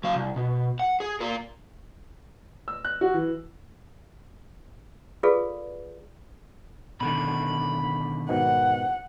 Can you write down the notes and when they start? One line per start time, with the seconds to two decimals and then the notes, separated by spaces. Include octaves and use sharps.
0.04 F#3 F5
0.15 C2
0.36 B2
0.79 F#5
1.00 G#4
1.21 F4 A#4
2.68 E6
2.85 F#6
3.01 F#4
3.14 E3
5.23 F4 G#4 A4 B4 D5 F5
7.01 B2 D3 D#3 B5
8.29 G#2 B2 D#3 F#5